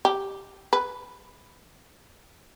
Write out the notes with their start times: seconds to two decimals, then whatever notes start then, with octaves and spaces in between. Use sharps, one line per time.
0.05 G4
0.73 B4